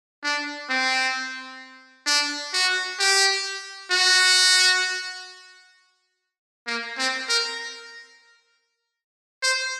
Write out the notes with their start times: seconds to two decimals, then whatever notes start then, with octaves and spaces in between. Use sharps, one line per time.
0.23 D4
0.69 C4
2.06 D4
2.54 F#4
2.99 G4
3.91 F#4
6.67 A#3
6.98 C4
7.29 A#4
9.43 C5